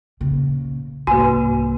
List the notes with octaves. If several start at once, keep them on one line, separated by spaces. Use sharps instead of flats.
A#2 C#3
C2 G#2 A#3 F#4 B4 G#5